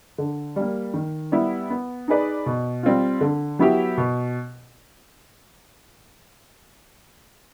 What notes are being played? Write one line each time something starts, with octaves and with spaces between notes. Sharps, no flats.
D3
G3 A#3
D#3
G3 B3 E4 G4
B3
D#4 G#4 B4 D5
B2
G3 C4 F4
D3
F#3 B3 E4 G4
B2